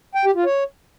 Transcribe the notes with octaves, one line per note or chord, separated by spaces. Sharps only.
G5
G4
F4
C#5